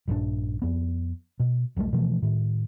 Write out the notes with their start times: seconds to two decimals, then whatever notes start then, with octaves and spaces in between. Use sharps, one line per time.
0.08 A#1 G2 E3 D4
0.62 F2 B3
1.40 B2
1.76 E1 B1 G3 A3
1.93 B2 E3 F3 A3
2.22 A2 D#3